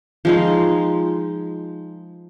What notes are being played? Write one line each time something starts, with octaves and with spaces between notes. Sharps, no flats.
F3 G#3 D#4